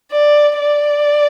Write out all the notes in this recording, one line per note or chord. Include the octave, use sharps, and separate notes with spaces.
D5
D5